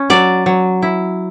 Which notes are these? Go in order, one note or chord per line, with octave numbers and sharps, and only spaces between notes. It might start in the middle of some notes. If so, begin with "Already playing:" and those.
Already playing: C#4
F#3 D5
F#3
E4